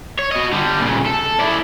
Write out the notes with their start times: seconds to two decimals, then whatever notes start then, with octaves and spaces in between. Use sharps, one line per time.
0.19 C#5
0.32 F#4 D#5
0.53 D3 G3
0.80 A#2 C#3
1.06 A4
1.40 E4 D5